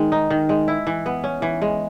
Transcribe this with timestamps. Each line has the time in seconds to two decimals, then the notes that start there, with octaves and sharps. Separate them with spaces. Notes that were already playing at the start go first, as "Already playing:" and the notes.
Already playing: D#3 G#3
0.12 D#4
0.31 D#3
0.49 G#3
0.68 E4
0.87 E3
1.06 B3
1.24 C#4
1.42 E3
1.62 G#3